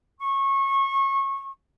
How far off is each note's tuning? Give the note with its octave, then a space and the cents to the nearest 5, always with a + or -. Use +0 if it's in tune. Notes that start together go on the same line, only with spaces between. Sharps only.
C#6 -25